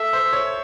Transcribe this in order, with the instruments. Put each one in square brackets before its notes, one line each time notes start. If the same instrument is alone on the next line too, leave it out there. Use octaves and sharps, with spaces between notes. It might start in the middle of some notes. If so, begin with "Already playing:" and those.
Already playing: [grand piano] A4 [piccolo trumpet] E5
[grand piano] C5
C#5